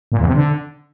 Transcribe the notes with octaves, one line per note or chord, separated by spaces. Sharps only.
A#2
E2
C3
D3